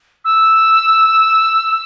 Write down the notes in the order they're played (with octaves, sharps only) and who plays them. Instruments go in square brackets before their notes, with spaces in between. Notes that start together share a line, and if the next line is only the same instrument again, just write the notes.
[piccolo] E6